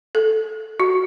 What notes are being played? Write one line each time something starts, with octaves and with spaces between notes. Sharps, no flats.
A4
F#4